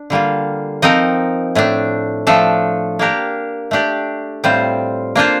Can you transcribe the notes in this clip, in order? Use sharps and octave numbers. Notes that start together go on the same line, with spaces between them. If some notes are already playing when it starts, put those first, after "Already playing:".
Already playing: D4
D3 G3 A#3 F4
F3 C4 D#4 A#4 D#5
A2 A3 D4
F3 A3 D4 A4
A#3 D4 G4 A#4
A3 D4 G4 D5
A2 G3 C4 F4 C5
A#3 D4 F4 C5